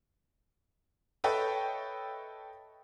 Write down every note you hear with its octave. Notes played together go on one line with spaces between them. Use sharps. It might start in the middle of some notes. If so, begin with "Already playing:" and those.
A4 B4 C#5 D#5 E5 G5